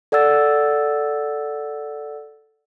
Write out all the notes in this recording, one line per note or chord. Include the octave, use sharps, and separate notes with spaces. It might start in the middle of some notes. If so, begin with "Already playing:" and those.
A4 D5 F#5 E6 A6